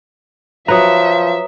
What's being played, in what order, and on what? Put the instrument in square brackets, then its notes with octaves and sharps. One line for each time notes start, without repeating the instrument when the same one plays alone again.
[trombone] F3 [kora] F#3 B4 [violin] E5 [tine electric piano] A#5 D#6